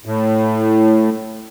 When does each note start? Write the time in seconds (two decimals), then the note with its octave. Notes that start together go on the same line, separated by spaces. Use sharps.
0.05 A2